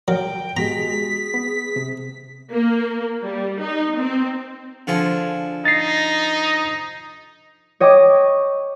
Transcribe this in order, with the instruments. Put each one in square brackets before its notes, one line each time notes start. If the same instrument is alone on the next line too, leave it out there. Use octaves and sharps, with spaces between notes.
[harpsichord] F#3 [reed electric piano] A#4 [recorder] G5
[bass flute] G#3 [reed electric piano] B3 F#4 G4 [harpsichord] A#5 [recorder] B6
[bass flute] G#4
[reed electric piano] B3
C3
[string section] A#3
G3
D#4
C4
[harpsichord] D3 F3 G#4
[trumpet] D#4 [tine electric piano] A6 A#6 C7
[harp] C#5 D#5 G5 C#6 D6